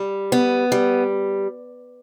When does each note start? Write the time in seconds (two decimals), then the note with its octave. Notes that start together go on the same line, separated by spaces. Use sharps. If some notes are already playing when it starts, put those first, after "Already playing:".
Already playing: G3
0.32 B3
0.72 G3